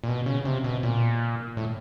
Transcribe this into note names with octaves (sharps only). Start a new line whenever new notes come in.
A#2
B2
C#3
C3
B2
A#2
A2